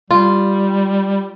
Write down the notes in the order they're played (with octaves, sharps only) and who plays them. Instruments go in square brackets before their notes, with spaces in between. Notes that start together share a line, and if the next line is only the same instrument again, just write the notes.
[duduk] G3 [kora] F4